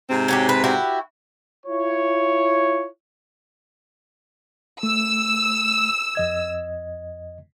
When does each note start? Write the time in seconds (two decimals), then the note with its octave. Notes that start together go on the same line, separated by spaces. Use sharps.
0.10 G#2 C3 C4
0.28 C#4 F#4 G4
0.49 B4
0.64 E4 F#4 G4
1.65 E4 F4 C#5
4.83 A3 E6
6.15 F2 D#5 G#6